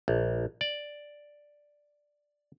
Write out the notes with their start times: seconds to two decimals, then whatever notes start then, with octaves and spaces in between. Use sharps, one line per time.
0.08 A#1
0.61 D5